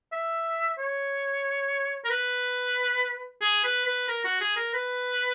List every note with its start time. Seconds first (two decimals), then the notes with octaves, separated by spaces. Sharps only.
0.12 E5
0.78 C#5
2.05 A#4
2.10 B4
3.41 G#4
3.64 B4
3.85 B4
4.08 A#4
4.24 F#4
4.41 G#4
4.56 A#4
4.74 B4